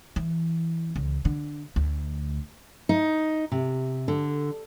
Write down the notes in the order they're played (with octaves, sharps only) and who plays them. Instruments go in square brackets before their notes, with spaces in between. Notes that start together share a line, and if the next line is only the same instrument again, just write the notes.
[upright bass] E3
C#2
D3
D2
[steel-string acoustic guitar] D#4
C3
D3